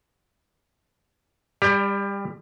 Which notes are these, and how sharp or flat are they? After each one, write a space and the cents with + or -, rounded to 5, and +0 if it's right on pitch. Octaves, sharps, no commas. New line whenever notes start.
G3 +25 G4 +25 D5 +0